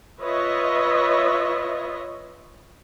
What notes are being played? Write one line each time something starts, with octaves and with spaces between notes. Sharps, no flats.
F4 B4 C#5 D#5 E5